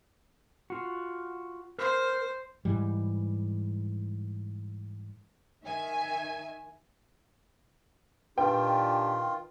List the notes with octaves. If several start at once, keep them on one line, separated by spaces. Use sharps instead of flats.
F4 F#4
A#4 C5
G#2 E3 G3
D#3 E5 G#5
A#2 D#3 D4 F4 G4 B4 G5